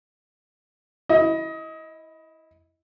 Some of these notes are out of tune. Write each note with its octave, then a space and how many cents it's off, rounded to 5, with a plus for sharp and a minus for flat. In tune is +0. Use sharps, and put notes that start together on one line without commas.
E4 -10 D#5 +25